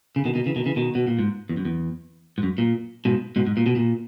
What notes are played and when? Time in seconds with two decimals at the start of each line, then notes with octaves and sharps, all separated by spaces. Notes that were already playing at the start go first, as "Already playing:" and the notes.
0.16 C#3
0.25 B2 D#3
0.35 B2 D#3
0.46 C#3 E3
0.56 B2 D#3
0.66 C#3 E3
0.76 B2 D#3
0.95 B2
1.07 A#2
1.19 G#2
1.49 E2
1.57 F#2
1.65 E2
2.38 G#2
2.43 F#2
2.58 A#2
3.05 G#2 B2
3.36 G#2 B2
3.47 G#2
3.57 A#2
3.66 B2
3.76 A#2